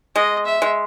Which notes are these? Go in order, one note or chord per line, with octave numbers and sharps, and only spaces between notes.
G#3 D#5
E5
G#3